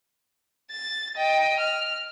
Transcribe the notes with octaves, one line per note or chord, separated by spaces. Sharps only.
A6
D#5 G5
F6